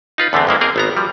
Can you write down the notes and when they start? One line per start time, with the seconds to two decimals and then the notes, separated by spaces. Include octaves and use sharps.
0.18 D#4 F4 B4
0.33 E2 D3 A3 B3 C4
0.47 F2 G#3 A#3 E4
0.61 A#3 C4 G#4 A#4
0.76 G#1 B3 A#5
0.97 F3 G3